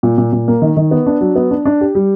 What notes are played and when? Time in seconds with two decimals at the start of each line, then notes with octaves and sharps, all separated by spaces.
0.03 A#2
0.18 A#2
0.33 A#2
0.48 A#3
0.62 D#3
0.77 D#3
0.91 B3
1.07 D4
1.21 F#3
1.36 B3
1.51 D4
1.65 D4
1.81 G4
1.95 G3